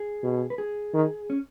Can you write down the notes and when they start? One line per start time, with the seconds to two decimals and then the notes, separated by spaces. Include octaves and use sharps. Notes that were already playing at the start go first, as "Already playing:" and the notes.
Already playing: G#4
0.23 B2
0.50 B4
0.58 G#4
0.93 D#3
1.30 C#4